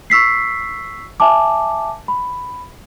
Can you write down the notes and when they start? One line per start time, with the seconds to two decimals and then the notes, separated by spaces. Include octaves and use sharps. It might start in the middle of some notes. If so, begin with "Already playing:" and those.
0.10 C#6 E6 B6 C7
1.20 E5 G#5 A5 D6
2.08 B5